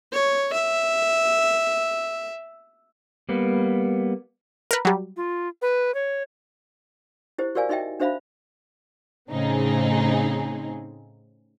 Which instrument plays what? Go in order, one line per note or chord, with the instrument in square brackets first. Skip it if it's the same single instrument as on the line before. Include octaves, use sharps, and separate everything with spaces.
[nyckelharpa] C#5
E5
[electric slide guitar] G3 A#3 B3
[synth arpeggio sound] A#4 B4
F#3 G3
[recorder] F4
B4
C#5
[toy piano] E4 G4 C5
F#4 G4 A#4 D5 F5 G#5
D#4 F#4 D#5 E5 G5
D4 F#4 C5 E5 F5 B5
[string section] A2 C#3 C4 D#4 G#4